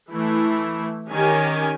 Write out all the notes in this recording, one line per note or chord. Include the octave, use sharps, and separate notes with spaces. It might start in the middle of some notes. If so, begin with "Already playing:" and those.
E3 A3 E4
D#3 C#4 G4 G#5